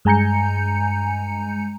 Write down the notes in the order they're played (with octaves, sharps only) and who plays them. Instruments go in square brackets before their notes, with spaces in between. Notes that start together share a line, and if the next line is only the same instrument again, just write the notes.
[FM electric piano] G2 G#3 G#5 A#5 G6 C#7